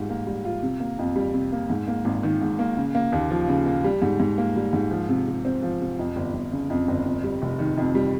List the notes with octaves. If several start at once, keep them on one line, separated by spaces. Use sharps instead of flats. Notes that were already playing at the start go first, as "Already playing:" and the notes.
Already playing: G#2 G3 F4
A#3
G3
F4
C3
A#3
F2
G3
C3
A#3
G#2
A#3
G#1
D#3
G#2
A#3
C#3
A#3
D#2
F3
C#3
A#3
G3
G#2
G#2
A#3
G3
G#2
F3
C3
C3
C4
F3
C3
F2
G1
G1
C#3
F2
G1
F2
G3
F1
D#3
F2
G3